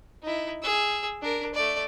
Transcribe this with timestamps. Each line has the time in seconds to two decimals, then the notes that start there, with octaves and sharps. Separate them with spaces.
0.23 D#4 E4
0.63 G#4 E6
1.22 D4 A#4
1.54 A3 D5